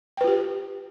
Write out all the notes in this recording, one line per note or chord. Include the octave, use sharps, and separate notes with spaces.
F4 G4 B4 G5